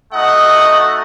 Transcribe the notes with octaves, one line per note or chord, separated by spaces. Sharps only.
A3 D#4 F#4 D#5 F#5